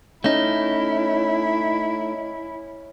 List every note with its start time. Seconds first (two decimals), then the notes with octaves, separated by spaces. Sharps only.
0.24 A3 C#4 D#4 E4 D#5